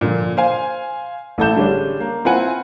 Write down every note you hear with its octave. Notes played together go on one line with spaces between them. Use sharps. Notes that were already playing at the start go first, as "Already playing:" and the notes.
A#2 D3 F3
C5 F5 G#5
A1 A2 A4 A5 G6 E7
D3 G3 G#3 C#4 D4
A#3
C4 E4 F4 B4 F#5 G#5